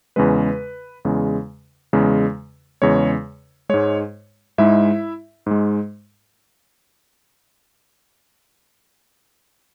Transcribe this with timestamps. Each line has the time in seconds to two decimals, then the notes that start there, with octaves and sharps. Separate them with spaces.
0.16 E2 C#3 G#3 B4
1.05 E2 C#3 G#3
1.93 E2 C#3 G#3
2.82 E2 C#3 G#3 C#5
3.69 G#2 G#3 C#5
4.58 G#2 G#3 E4 E5
5.46 G#2 G#3